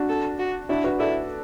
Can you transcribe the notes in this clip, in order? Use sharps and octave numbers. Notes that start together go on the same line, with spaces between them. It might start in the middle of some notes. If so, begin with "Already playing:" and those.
Already playing: D4 F#4
A4
F#4
D4 E4 F#4
F#4 B4
E4 A4 D5